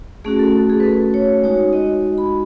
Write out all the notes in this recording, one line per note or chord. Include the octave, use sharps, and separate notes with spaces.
A3 C#4 F#4 G#4
A4
G#4
B4
A4
C#5
G#3 D#4 F#4 C#5
D#5
B5